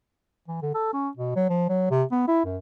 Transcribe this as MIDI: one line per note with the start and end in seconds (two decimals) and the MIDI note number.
0.48 0.59 52
0.62 0.71 50
0.74 0.92 69
0.94 1.09 61
1.17 1.34 47
1.36 1.49 54
1.49 1.69 53
1.69 1.88 54
1.91 2.04 48
2.11 2.27 59
2.28 2.43 64
2.45 2.57 42